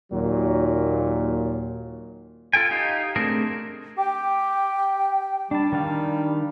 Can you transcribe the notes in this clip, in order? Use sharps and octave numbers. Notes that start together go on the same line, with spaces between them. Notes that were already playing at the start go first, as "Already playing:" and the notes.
D#2 A#2 F#3
F4 A4 G5 G#5
D#4 G4 F5
A3 C4 D4 G#4 A#4
G4 G5
G3 D4 A5
D#3 D4 F5